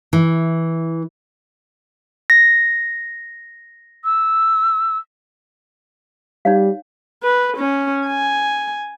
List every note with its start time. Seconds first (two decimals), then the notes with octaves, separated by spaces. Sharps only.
0.13 E3
2.30 A#6
4.05 E6
6.45 G3 D#4 C#5 F5
7.23 B4
7.57 C#4
8.07 G#5